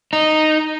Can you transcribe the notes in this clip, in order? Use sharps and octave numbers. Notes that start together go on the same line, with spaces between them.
D#4